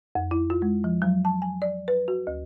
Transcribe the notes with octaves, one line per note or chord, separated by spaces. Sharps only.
F2
E4
F4
G#3
F3
F#3
A5
G#5
D5
B4
F#4
D2